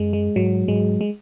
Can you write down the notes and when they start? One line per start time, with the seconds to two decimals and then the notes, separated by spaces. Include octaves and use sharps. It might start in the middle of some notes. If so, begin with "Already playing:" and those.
Already playing: F#2 G#3
0.13 G#3
0.36 G#2 F#3
0.68 G#2 G#3
1.01 G#3